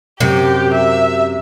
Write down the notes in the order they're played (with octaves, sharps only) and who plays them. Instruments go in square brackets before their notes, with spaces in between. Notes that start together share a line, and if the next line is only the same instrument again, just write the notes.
[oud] F#2 C3 [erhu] G4
[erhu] E5